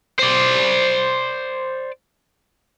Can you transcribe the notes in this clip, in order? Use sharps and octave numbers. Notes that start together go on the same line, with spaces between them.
C5 D5